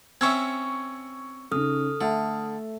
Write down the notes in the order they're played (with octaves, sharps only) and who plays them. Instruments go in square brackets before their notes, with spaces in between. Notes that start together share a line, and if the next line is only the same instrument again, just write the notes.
[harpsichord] C4 C#4 E5 [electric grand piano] C#6 E6 G#6
[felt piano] C#3 C#4 D#4 [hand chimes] A4 D#6 F6
[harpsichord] D3 [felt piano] A3 E5 A5